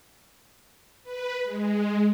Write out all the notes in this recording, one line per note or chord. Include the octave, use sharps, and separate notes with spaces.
B4
G#3